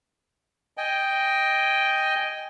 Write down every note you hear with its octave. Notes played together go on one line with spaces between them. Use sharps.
D#5 G5 G#5